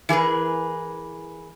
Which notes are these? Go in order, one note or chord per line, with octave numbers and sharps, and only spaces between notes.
E3 G#4 A#4 B4